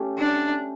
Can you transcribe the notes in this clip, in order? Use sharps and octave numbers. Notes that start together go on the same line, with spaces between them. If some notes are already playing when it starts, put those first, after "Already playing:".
Already playing: A3 C#4 G4
D4